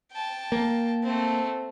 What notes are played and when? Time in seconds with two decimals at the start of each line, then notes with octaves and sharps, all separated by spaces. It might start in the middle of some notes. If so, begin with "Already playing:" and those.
0.12 G5 A5
0.52 A#3
1.03 A3 C4